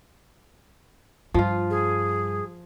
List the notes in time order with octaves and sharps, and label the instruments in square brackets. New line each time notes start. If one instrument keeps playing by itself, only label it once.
[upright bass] G2 [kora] F3 F4
[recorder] G#4